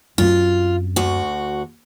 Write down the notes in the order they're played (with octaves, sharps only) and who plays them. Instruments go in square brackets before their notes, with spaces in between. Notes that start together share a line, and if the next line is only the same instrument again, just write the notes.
[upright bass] F#2 C4 [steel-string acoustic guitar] F4
[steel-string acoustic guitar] D2 F#4